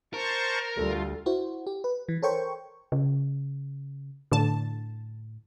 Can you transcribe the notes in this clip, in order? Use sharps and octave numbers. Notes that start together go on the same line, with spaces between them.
A#4 C5 A5 C#6
D2 G3 A3 F4 A4
E4 F#4 C5
G4
B4
E3
A4 A#4 C5 C#5 G5 C#6
C#3
A2 D3 A5